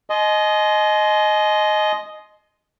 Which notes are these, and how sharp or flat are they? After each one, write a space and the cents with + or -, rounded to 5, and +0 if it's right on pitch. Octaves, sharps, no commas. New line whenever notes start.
D#5 +0 G#5 +40 C6 +0